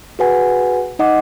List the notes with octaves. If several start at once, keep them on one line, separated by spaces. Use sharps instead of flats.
F#4 G#4 B4 F#5 G#5
D#4 D#5 F#5 D6